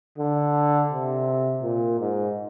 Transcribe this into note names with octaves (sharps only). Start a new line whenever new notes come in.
D3
C3
A#2
G#2